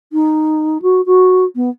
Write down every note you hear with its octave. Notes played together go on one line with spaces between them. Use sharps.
D#4
F#4
F#4
B3